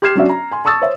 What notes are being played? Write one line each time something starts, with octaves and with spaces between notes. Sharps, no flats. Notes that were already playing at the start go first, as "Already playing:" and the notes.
G4 C6 F6 G#6 C7 E7
F#3 C#4 D4 F#4 D5 E5
A#5
G#5 C6
A5 C#6 D#6 E6 A6
C5 C#5 E5